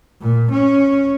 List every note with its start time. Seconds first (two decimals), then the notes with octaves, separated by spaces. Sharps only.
0.22 A#2
0.51 C#4